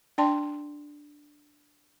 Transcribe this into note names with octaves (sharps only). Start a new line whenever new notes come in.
D4 D5 G5 A5 C6